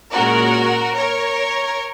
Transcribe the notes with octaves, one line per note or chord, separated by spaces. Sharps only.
A#2 G#3 C#4 F#4 A#4
A#4 C#5